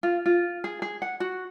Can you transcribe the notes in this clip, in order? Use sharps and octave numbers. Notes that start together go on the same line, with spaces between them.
F4
F4
G#4
G#4
F#5
F#4